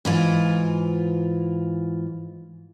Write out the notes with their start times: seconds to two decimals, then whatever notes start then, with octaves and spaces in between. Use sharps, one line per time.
0.05 G#2 E3 F4